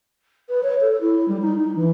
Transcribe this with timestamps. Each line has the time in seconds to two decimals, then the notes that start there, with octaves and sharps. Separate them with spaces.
0.49 B4
0.63 C#5
0.81 A4
1.01 E4
1.28 G3
1.41 D#4
1.60 D#4
1.75 E3